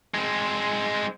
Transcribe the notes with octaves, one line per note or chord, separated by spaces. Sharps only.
G#3 C4